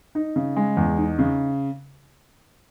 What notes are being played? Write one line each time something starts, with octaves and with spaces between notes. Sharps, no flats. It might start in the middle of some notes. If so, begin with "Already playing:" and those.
D#4
C#3
G#3
E2
D#4
C#3